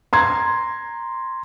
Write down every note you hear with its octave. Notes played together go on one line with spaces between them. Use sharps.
A#5 C6 G#6